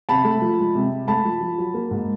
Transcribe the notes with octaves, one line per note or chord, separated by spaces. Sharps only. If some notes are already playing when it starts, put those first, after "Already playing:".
C3 A5 B5
A3
F3
G#3
C3
G#3
A3 A5 B5
F3
F3
F#3
A#3
G#2